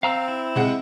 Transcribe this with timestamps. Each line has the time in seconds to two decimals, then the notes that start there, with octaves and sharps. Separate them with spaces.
0.03 C4 F5 A#5 E6
0.28 E4
0.56 C3 G#3 F#5